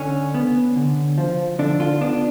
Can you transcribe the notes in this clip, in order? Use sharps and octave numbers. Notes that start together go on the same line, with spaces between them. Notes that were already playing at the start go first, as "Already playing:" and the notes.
Already playing: D3 C#4
B3
D3
F3
D3 D4
F4
B3 D4